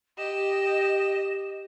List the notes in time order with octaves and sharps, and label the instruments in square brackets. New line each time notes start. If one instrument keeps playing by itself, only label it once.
[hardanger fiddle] G4 [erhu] D#5 [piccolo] E7